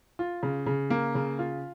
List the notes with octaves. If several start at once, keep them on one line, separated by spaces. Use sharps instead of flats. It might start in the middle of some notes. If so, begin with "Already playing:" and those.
F4
C#3
C#3
A#3
C#3
F4